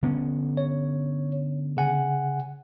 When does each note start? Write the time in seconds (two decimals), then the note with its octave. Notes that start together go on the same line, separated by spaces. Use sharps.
0.03 D3 B3 C#4
0.57 C#5
1.77 C#3 F#5 G#5